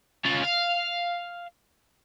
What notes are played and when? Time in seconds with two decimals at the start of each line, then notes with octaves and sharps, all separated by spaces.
0.25 C#4 F4
0.43 F5